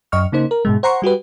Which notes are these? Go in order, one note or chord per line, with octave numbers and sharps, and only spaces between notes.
F#2 D#5 C#6 F6
C#3 A#3 D#4 C5
A#4
G#2 B2 G#3
C5 F#5 A#5 C6 C#6
G3 F#4 G4 B4